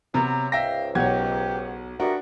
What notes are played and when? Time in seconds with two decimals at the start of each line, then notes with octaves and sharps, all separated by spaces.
0.14 C3 F#3 B3 A#5
0.52 C#2 G#2 E5 F5 G5 A#6
0.95 B1 B2 G4 C#5 F#5 G#6
2.00 G3 A3 B3 D4 F#4 A#4